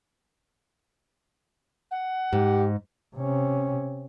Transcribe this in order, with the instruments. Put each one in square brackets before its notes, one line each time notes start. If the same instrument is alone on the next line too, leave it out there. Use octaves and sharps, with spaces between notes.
[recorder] F#5
[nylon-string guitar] G#2 [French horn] G4
[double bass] C3 C#4